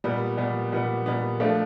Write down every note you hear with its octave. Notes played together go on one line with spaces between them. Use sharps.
A#2 G3 B3
A#2 G3 B3
A#2 G3 B3
A#2 G3 B3
F3 A3 D4 F4